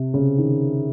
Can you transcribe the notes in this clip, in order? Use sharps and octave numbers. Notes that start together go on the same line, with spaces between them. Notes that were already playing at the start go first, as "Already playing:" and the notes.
Already playing: C3
C#3
D#3